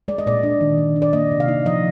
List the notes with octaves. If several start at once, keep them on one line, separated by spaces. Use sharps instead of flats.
G#3 D5
D#5
A#2 D5
D4
D#3
D#3
D4
D5
A#3 D#5
C3
F5
D#4
F3 D#5